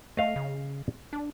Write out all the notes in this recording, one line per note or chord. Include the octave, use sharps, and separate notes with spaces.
A3 D#5 F5
C#3
D4